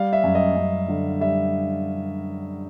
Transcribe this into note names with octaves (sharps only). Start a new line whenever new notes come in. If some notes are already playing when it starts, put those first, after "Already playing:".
Already playing: G3 F5
E5
F#2
D#5
F#2
D3
G3 E5